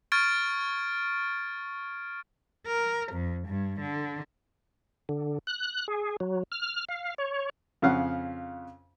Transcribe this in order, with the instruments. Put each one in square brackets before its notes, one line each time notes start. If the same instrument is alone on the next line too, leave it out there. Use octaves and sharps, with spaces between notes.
[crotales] C#6 F6 G#6 A6 D7
[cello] A#4
F2
G2
D3
[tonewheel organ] D3
F#6
G#4
F#3
F6
F5
C#5
[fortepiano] F2 C#3 C#4 F5 F#5